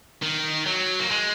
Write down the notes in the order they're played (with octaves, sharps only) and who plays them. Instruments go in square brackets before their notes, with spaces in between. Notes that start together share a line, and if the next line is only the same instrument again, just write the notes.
[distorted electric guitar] D#3
F#3
A#3
G#3